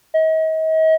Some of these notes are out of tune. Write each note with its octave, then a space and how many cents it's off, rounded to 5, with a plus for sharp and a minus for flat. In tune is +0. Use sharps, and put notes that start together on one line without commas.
D#5 +40